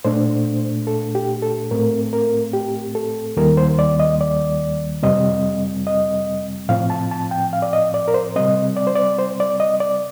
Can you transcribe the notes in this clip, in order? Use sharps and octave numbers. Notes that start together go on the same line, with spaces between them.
A#2 A3 D4 C5
A4
G4
A4
A2 A3 C4 A#4
A#4
G4
A4
D#2 D#3 G3 A#3 A#4
C5
D5
D#5
D5
F2 C3 G3 C4 D#5
D#5
A2 F3 C4 F5
A5
A5
G5
F5
D5
D#5
D5
A#4
C5
C3 G3 C4 D#5
D5
C5
D5
C5
D5
D#5
D5